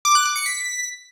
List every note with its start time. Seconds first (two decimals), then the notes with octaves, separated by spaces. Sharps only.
0.05 D6
0.15 F#6
0.25 D6
0.36 C#7
0.46 B6